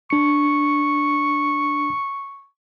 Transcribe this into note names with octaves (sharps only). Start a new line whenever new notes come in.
D4 C#6 C#7